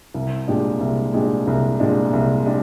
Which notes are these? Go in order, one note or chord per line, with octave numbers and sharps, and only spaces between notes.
C2
A#2 G#3 D4 G4
C2
A#2 G#3 D4 G4
C2
A#2 G#3 D4 G4
C2
G#3 D4 G4